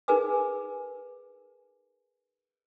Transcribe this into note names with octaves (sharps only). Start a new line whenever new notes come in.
D#4 G#4 A#4 B4 G#5 D6